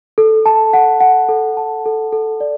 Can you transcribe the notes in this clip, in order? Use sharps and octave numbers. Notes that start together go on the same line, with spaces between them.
A4
A5
F#5
F#5
A4
A5
A4
A4
D5